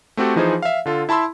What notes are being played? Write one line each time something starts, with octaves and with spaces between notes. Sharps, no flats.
A3 C4 F#4 G4 A4
E3 F3 D#4 F4 G#4 C5
E5 F5
D3 F4 A4
E4 A5 B5 C6 E6